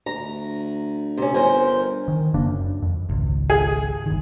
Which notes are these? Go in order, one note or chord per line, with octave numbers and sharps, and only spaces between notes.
D2 A#5
C3 C#4
G1 A#4 C5 G#5
D#3
F1 C#3 A#3 D4
F#2
F2
G#1 C#2
G#4
G1 D#3